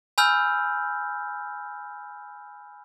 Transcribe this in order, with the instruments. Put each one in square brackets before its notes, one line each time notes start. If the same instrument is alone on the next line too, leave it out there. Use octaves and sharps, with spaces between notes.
[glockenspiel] G#5 B5 E6 F6 G6